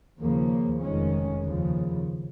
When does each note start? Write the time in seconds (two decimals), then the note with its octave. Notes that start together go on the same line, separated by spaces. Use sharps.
0.20 D#2 C#3 F3 A#3
0.82 F1 F2 D#3 G#3 C#4
1.44 D#2 C#3 F3